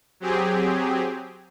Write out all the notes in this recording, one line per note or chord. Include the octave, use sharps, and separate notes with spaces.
F#3 C4 G4 G#4